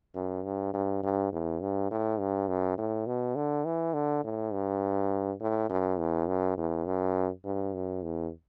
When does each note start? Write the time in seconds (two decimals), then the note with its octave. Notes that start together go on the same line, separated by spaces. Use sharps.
0.15 F#2
0.45 G2
0.74 G2
1.03 G2
1.33 E2
1.61 G2
1.91 A2
2.20 G2
2.48 F#2
2.78 A2
3.07 B2
3.36 D3
3.65 E3
3.94 D3
4.24 A2
4.53 G2
5.41 A2
5.69 F#2
5.99 E2
6.27 F#2
6.58 E2
6.86 F#2
7.45 G2
7.74 F#2
8.03 E2